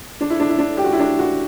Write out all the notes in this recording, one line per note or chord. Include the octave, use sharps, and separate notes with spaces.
D4
E4
D4
E4
D4
G4
F#4
E4
D4
F#4